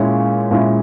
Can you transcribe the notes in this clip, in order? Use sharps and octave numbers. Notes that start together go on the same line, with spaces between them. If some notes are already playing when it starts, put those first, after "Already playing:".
Already playing: A#2 G#3 C#4 E4
A#2 G#3 C#4 E4